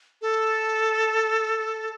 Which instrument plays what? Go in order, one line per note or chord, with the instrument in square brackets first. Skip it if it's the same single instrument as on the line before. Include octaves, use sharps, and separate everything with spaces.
[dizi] A4